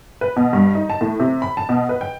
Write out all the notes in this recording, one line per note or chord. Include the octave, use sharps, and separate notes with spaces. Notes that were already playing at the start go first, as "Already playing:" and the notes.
B4
B2
G2
D#4
A5
A2
C3
B5
A5
B2
B4
G5